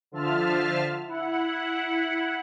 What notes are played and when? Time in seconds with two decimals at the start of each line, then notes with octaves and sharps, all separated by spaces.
0.12 D3 F3 F4 E5 A5 F6
1.07 E4 F#5